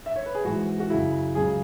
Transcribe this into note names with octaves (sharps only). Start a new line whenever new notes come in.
E5
C#5
B4
G#4
G#2 E3 G#3 F#4
F#4
F#2 C#3 F#3 E4
C#2 C#3 F#3 G#4